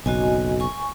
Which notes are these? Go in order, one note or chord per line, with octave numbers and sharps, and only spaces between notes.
F#1 B1 F#4 D#5 G#5
G#5 C#6